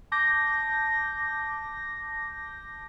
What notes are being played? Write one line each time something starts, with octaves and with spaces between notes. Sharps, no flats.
A5 D6 G6 A#6